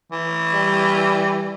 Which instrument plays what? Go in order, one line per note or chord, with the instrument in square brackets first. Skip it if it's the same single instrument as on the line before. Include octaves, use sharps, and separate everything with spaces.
[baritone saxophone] E3
[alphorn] G3